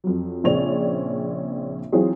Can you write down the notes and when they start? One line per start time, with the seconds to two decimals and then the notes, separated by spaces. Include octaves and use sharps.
0.04 F2 F#3
0.44 A#1 C#3 C4 C#5 D5 F7
1.92 E3 F#3 C4 F4 G#4 C#5